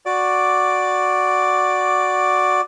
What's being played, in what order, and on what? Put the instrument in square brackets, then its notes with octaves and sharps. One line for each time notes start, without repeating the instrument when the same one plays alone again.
[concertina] F#4 D5 D6